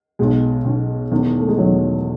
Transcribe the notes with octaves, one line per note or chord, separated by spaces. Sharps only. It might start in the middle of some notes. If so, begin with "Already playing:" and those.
B1 B2 G#3
B1 B2
E1 E2 D#3
A3
G#3
E1 E2 D#3 F#3